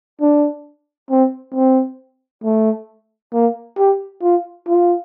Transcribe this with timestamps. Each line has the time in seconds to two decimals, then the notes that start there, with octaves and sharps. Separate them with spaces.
0.21 D4
1.10 C4
1.55 C4
2.44 A3
3.33 A#3
3.78 G4
4.23 F4
4.69 F4